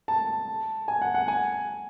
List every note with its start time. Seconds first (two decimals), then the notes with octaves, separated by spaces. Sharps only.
0.08 A5
0.88 G#5
1.01 F#5
1.15 F#5
1.28 G#5